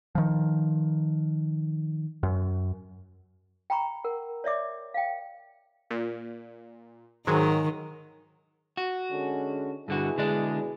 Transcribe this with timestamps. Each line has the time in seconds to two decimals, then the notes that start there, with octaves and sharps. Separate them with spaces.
0.15 D#3 F3
2.23 F#2
3.70 G5 A#5 B5 C#6
4.04 A#4 F#5
4.44 C#5 D5 E5 D6
4.94 F5 G5
5.91 A#2
7.27 G#2 D#3 F#3 G#3
8.77 F#4
9.11 D3 G#3 C#4
9.88 G2 B2 D3 E4 F#4 G#4
10.18 D3 G#3 D4